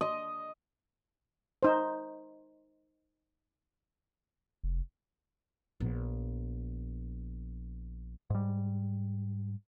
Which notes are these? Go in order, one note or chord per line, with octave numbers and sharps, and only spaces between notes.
D#5
D#4 C5
F1
A#1 B3
G#2 G3